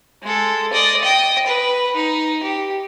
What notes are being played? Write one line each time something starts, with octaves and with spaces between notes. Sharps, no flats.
G#3 A4
D5 D#5
D#5 G5
B4
D#4
G4